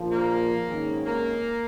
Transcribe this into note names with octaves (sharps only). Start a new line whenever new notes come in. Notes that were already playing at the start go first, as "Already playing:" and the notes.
Already playing: A#1 A#2 F3
A#3
G#1 G#2 D#3 C#4 G#4
A#3